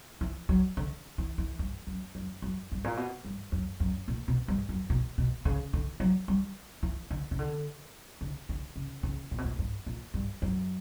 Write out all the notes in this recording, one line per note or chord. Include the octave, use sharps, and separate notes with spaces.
E3
F#3
D3
E3
E3
G2
F#2
F#2
F#2
G2
A#2
B2
G2
F#2
F#2
A#2
B2
G2
F#2
B2
B2
C#3
D3
F#3
G3
E3
D3
C#3
D3
D3
D3
C#3
C#3
A#2
B2
A#2
G2
A#2
G2
F#2